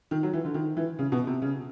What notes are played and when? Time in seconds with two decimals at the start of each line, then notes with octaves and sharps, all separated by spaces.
0.11 D#3
0.23 F#3
0.33 E3
0.45 D3
0.54 D#3
0.77 E3
0.99 C#3
1.12 B2
1.27 C3
1.42 C#3